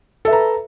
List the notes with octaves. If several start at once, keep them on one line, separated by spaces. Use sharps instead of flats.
A4 B4 E5 A#5